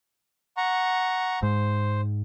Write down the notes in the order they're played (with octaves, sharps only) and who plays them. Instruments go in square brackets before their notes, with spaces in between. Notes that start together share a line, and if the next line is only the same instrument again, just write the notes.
[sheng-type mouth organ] F#5 A#5 C#6
[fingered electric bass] G#2 [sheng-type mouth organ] C5